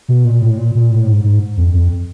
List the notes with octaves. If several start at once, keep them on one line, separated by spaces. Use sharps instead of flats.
B2
A#2
A2
A#2
A#2
A2
G#2
G#2
F2
F2